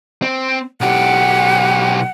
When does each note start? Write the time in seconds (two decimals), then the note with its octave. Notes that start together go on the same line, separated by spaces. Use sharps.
0.22 C4
0.81 B1 G4 F#5